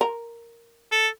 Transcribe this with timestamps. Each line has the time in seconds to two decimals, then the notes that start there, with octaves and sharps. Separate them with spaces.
0.01 A#4
0.92 A4